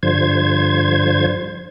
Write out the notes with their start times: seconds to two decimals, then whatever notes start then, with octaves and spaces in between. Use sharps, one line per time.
0.03 G2 D3 F3 C5 G#6